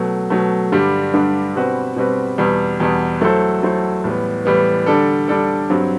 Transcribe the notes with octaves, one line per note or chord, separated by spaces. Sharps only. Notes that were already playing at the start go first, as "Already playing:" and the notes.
Already playing: B2 F#3 A3
B2 F#3 A3
G2 D3 G3 D4
G2 D3 G3 D4
B2 G3 C4 F#4 B4
B2 G3 C4 F#4 B4
E2 B2 G3
E2 B2 G3
F#3 A3 E4 A4 C5
F#3 A3 E4 A4 C5
A2 E3 G3 B3
A2 E3 G3 B3
D3 G3 D4 A4
D3 G3 D4 A4
G2 F#3 C4